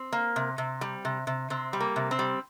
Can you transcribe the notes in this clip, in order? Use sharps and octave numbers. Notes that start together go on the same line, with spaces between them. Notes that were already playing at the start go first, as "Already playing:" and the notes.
Already playing: C4
A#3
C3
C3
G3
C3
C3
C3 C4
G3
A#3
C3
C4
G3